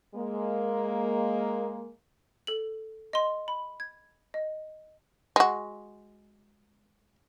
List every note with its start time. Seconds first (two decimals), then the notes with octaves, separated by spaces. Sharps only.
0.15 G#3 A#3
2.47 A4 F#7
3.13 D#5 C6
3.48 B5
3.80 G#6
4.34 D#5
5.36 G#3 F#4